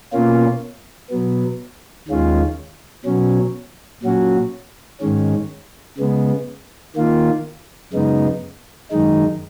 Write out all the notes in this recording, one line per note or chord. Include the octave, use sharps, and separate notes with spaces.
B2 A#3 C#4 F4
B2 F#3 B3
D#2 D#3 G#3 C#4 F4
B2 F#3 C#4
A#2 F#3 C#4 F#4
G#2 D#3 G#3 C#4
C#3 G#3 B3
D#3 A#3 F4
F#2 C#3 G#3 B3 D#4
F#2 D#3 G#3 D#4